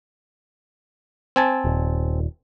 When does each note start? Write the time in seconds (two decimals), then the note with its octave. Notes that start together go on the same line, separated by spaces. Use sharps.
1.36 C4 G#5 A5
1.65 D#1